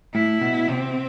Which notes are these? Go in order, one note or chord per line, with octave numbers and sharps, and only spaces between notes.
A2 E4
B2
C3 C4